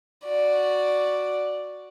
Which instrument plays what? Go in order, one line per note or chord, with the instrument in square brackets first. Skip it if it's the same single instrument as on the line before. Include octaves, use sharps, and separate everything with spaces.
[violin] F#4 D5